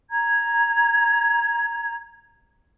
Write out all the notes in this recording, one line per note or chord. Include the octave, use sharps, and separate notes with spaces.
A#5 G#6